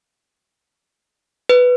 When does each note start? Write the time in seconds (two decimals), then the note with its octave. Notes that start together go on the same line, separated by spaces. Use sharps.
1.49 B4